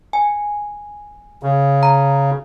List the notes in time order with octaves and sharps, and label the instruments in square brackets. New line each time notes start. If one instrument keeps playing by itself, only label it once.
[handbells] G#5
[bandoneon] C#3
[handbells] A#5